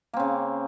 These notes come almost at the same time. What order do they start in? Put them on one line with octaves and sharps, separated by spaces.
A#3 C4 C#3